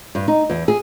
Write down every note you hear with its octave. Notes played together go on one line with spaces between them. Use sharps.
G2
D#4
E2
G#4